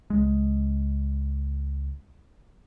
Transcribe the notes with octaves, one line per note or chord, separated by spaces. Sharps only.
C#2 G#3